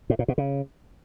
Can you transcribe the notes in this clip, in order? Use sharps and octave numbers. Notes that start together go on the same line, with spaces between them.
A2
A#2
B2
C#3